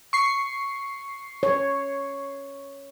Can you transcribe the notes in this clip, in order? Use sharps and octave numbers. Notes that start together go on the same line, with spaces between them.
C#6 C7
C#5